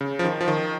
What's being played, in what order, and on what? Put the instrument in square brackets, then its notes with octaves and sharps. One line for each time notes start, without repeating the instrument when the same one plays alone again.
[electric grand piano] C#3
F3
D#3
F3
D#3